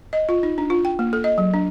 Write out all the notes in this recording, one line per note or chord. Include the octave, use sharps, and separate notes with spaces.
D#5
F4
D#4
D4
F4
G5
A#3
A4
D#5
F#3
D4